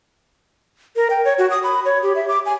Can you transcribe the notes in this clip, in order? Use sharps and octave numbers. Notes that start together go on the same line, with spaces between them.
A#4
G5
C#5
F#4
D#6
B5
C#5
G4
E5
D6
G#5